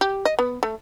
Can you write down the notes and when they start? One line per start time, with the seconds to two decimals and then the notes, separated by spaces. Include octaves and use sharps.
0.01 G4
0.25 D#5
0.39 B3
0.63 A3